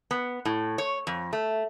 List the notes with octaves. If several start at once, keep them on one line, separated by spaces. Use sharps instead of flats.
B3
A2
C#5
F2
A3